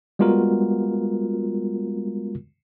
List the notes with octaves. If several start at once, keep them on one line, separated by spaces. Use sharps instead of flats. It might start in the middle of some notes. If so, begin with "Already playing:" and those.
G3 G#3 B3 F4 F#4 A#4